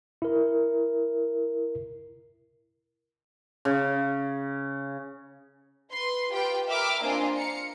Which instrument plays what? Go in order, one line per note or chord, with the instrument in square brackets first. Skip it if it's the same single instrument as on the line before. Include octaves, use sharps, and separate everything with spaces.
[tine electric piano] E4 A#4
[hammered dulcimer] C#3
[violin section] B4 C6
F4 G4 B4 G5
A#4 E5 G5 B5 D6 F6
A#3 C4 D4 F4 D#5 G#5
F5 A#5 C#7